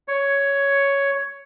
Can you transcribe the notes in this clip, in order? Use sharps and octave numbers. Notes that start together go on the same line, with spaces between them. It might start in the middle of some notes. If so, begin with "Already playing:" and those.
C#5